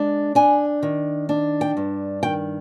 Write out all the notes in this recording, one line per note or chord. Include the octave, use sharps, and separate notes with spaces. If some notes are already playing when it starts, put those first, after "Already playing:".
Already playing: G#3 D4
D4 G#5
D#3
D4
G5
G2
D#3 G5